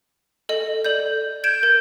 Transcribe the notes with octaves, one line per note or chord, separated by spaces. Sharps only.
A4 D#5
A4 D5 G6
G6 G#6 D7 E7
A#4 G#6